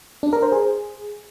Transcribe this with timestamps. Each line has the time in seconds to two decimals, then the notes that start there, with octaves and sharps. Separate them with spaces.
0.23 D4
0.33 A#4
0.42 C5
0.52 G#4